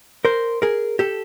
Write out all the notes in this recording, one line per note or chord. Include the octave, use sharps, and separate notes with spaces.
A#4 C5
G#4 A#4
G4 A4